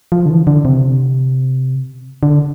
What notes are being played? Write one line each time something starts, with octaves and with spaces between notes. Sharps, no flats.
F3
D3
E3
D3
C3
D3